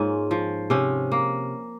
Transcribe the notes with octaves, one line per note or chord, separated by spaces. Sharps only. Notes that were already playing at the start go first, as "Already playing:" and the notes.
Already playing: G#2 A#3 C#4 F4
F3
C3 C#4
A#3